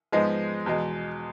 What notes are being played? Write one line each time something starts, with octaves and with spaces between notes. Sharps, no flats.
G#2 F3 G#3 B3 D#4
E2 B2 G#3